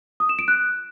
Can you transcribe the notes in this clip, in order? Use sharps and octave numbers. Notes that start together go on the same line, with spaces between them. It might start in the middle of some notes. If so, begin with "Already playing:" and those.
D#6
E7
D7
F#6